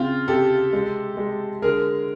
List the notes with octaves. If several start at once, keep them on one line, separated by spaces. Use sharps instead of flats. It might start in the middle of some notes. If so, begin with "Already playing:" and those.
Already playing: C#3 C4 F4
C3 G4 A4
G#3
G#3
D3 G#4 A#4